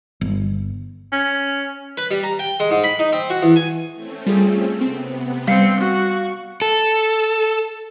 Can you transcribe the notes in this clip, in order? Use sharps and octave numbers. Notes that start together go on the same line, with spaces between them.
G1
C#4
B4
G3
A#5
G5
G#3
G#2
B5
D#4
C4
F#4
E2
G#5
A3 C4 C#4
G3 F4 G#4
C3 B3 C4
G3 C4 F5 C7 C#7
F#4 C#6
A4